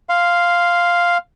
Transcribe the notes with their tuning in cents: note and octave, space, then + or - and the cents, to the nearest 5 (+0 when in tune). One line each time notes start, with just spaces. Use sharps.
F5 +0 C6 -5